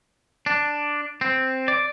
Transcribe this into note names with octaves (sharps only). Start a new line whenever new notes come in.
D4
C4
D5